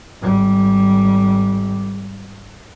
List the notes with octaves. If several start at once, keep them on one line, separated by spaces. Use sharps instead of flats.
G#1 G3